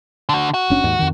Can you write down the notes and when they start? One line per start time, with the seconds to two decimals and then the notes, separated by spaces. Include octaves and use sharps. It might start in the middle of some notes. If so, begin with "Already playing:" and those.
0.29 D3 F#4
0.54 F#4
0.70 F#1 C#4 D4
0.84 D#2 G#2
0.99 F2 D#3